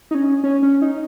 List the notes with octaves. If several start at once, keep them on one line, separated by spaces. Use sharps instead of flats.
D#4
C#4
C#4
C#4
D#4